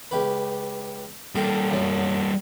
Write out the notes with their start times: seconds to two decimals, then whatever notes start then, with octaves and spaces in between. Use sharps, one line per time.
0.11 C#2 G4 B4
1.35 G3 A#3 G4 A4
1.71 F#2 F#3